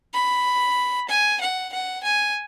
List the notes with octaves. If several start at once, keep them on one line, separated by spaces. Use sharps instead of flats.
B5
G#5
F#5
F#5
G#5